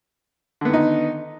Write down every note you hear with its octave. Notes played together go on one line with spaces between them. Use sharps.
D3 D#3 B3 D#4